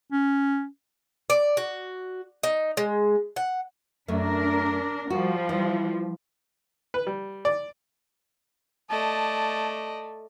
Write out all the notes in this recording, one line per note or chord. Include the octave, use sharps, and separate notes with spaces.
C#4
D5
F#4
D#4
G#3
F#5
F#2 A3 D4 A#4
F3 G3 F#4
E3
B4
G3
D5
A3 D5 D#5 A5